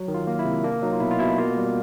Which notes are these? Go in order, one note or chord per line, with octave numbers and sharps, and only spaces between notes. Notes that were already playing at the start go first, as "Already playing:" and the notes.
Already playing: F#3
D#3
F4
A#3
E4
C3
A#3 D4
F#3 D#4
F4
B2 E4
F4
B2 E4
A#3 F4
G3